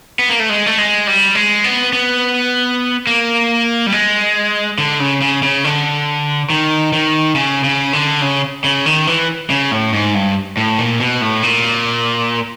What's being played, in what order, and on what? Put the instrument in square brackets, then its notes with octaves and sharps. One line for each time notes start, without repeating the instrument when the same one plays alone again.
[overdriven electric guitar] B3
A#3
A3
G#3
A3
G#3
G3
G#3
B3
B3
A#3
G3
G#3
D3
C#3
C#3
C#3
D3
D#3
D#3
C#3
C#3
D3
C#3
C#3
D#3
E3
C#3
A2
G#2
G2
A2
A#2
B2
A2
A#2